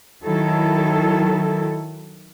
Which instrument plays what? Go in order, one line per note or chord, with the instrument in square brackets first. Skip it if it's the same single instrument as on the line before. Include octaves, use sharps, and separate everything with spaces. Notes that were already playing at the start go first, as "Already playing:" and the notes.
[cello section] D#3 F#3 E4 A4